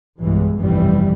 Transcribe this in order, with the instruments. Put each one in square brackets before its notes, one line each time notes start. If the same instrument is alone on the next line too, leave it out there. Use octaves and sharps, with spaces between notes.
[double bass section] B1 E2 G2 E3 G#3
F1 B1 G2 E3 G3